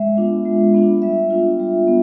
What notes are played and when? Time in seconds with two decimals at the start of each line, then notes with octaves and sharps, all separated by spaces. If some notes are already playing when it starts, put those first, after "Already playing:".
Already playing: G#3 E5
0.17 B3 D4 F4
0.45 G#3
0.74 B3 D4 F4
1.02 G3 E5
1.30 B3 D4 F4
1.60 G3
1.88 B3